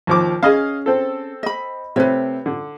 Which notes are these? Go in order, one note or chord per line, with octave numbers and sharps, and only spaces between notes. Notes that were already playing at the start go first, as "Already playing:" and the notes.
D#2 F3 D6
C#4 G#4 D#5 F5
C4 A4
D#5 B5
C3 A3 C4 B4 C#5
D3